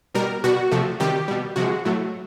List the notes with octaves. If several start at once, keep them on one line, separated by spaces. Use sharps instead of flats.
B2 G3 A#4
B2 G3 F#4
C3 F3 A3
C3 D#3 G3 G4
B2 G3
C3 F3 G#3 F#4
A2 F#3 A3